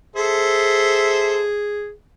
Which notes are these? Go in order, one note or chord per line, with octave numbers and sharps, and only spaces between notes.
G#4 A4 C5 E5